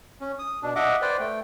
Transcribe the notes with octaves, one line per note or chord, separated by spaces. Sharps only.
C#4
D#6
B2 D4
D#5 E5 F#5 D6
B4 C5 D5 G5
A3 G5